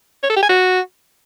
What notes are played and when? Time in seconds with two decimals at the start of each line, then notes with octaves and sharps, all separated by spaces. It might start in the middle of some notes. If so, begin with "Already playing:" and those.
0.23 C#5
0.30 A4
0.36 G4
0.43 G#5
0.49 F#4